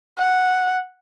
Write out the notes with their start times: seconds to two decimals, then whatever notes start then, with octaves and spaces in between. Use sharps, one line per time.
0.18 F#5